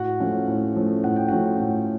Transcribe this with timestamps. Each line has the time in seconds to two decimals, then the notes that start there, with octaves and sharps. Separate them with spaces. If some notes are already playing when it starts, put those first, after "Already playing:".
Already playing: A2 F#4 F#5
0.20 F3 A3 C#4
0.48 A2
0.76 F3 A3 C#4
1.04 A2 F#5
1.16 G5
1.29 F3 A3 C#4 F#4 F#5
1.60 A2